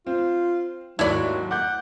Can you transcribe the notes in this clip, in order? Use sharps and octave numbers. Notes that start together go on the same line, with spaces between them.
C4 F4
D#2 G#2 F#3 E4 C#5 D5
F#5 D6 G6